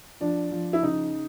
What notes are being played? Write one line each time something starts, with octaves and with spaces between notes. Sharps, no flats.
F3 D4
F3
E4
C#3 D#4